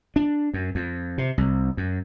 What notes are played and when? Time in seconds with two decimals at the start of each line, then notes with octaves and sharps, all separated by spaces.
0.16 D4
0.54 F#2
0.75 F2
1.18 C3
1.38 C2
1.77 F#2